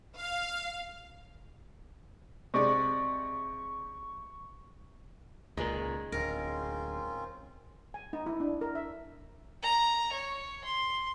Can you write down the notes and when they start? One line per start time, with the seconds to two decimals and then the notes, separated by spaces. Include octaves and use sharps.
0.17 F5
2.54 C3 G#3 D5 C#6
5.57 C#2 A#2 D#3 G#3
6.12 D1 C4 C#4 F4 A#4
7.94 G#5
8.13 D#4
8.26 E4
8.40 D4
8.61 A#4
8.75 E5
9.63 A#5
10.12 C#5
10.64 C6